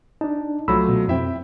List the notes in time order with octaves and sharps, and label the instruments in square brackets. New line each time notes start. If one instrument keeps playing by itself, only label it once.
[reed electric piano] D4 D#4 [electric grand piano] A5
[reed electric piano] C2 B5 E6 [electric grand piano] F3 F#3 A3
[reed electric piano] B2
[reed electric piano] F2 C4 [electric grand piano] E4 E5 G5